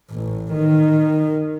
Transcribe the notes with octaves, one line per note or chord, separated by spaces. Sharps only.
A1
D#3